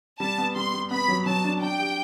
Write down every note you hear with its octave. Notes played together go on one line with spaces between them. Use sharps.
G3 A5
B3
G3 C6
G3
B3 B5
F#3
F#3 A5
D4
D4 G5
G4